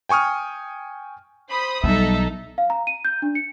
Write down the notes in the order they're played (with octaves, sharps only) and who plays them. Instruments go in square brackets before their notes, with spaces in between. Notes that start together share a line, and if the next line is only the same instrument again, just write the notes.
[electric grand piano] G5 G#5 C#6 D#6 F6
[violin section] C5 B5 D#6
[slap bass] B1 [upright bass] G3 [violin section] D#4 A4 [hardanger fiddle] E5
[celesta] F5
A#5
D#7
G6
D4
C#7